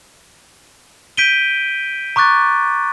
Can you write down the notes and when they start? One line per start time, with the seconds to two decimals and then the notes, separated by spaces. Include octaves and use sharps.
1.17 G6 B6 D7 D#7 G7
2.16 A#5 C#6 D6 F#6 A6